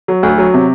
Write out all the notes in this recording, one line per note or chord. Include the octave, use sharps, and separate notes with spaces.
F#3
D2
F#3
C3